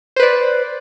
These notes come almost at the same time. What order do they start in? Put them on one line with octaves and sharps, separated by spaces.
C5 B4 D5